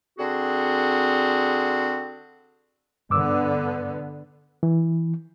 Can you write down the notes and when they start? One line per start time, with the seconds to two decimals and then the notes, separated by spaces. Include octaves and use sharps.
0.19 D3 C4 F#4 G#4
3.10 G2 D3 B3 D6 E6
4.63 E3